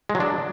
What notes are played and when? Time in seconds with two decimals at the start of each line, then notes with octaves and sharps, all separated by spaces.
0.10 G#3
0.15 F#3
0.20 D4